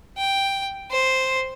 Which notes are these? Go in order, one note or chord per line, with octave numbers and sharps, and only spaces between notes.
G5
C5